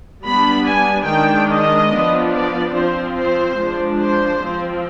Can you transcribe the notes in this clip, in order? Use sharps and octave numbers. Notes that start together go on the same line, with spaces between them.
G3 B3 D4 B5
G#5
D#3 G#3 D4 G5
D#5
F3 B3 D4
D5
F3 C4 C5
C5
F3 G#3 D4
C5
F3 C4